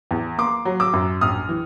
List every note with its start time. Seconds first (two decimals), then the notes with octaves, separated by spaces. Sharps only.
0.11 E2
0.38 A#3 C6 D6
0.65 F#3
0.80 D6 E6
0.93 F#2
1.21 A#1 D#6 F6
1.49 E3